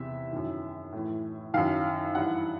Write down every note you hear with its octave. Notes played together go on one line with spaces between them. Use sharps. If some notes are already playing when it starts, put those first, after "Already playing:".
Already playing: E2 C3 E3 E5
F#2 D#3
A2 E3
F#2 D#3 F5
G2 E3 F#5